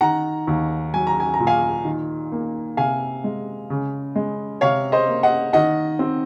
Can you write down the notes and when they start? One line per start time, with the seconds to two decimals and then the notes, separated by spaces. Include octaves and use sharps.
0.01 D#3 F#5 A#5
0.47 D#2
0.94 F#3 G#5
1.07 A#5
1.20 G#5
1.34 A#5
1.40 A#2
1.47 F5 G#5
1.85 D#3
2.32 A#3
2.77 C3 F5 G#5
3.24 G#3
3.70 C#3
4.16 G#3
4.61 C3 C#5 F5
4.92 C5 D#5
5.08 A#3
5.23 D#5 F#5
5.53 D#3 D#5 F#5
5.99 C4